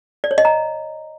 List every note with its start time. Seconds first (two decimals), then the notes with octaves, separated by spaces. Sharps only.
0.24 D5
0.31 C#5
0.38 D#5
0.45 A#5